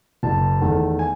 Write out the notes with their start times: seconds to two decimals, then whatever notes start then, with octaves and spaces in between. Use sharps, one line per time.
0.23 F#1 A5
0.61 E2 D#3 A3
0.99 G#5